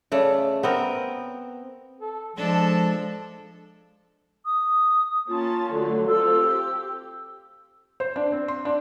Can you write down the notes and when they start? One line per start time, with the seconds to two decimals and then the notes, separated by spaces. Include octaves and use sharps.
0.12 C#3 A3 D5
0.63 B3 C4 A#4
2.01 A4
2.36 F3 G#3 D4 A4
4.46 D#6
5.28 A#3 C#4 F4 A5
5.72 D3 F#3 A3
6.09 C4 F4 A4 E6
6.45 G4
8.00 C5
8.16 D4
8.32 C4
8.48 C6
8.65 D4